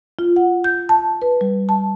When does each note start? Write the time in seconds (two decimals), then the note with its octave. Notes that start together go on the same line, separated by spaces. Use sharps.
0.19 F4
0.36 F#5
0.64 G6
0.89 A5
1.22 B4
1.41 G3
1.69 A5